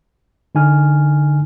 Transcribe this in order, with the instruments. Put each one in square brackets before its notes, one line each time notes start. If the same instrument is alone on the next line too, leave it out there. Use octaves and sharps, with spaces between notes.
[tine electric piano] D3 D#4 G#5 F6